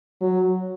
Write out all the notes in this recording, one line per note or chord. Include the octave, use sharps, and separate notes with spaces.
F#3